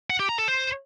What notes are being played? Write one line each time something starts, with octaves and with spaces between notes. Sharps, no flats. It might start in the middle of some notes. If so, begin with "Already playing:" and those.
F#5
G4
A#5
A4
C5